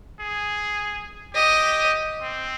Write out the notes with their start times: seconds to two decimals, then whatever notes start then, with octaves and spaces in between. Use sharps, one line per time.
0.20 G#4
1.35 G4 D#5
2.22 C4